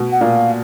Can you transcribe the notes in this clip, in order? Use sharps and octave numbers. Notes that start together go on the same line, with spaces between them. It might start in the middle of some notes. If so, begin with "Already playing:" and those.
Already playing: B2
F#5
A#2 F5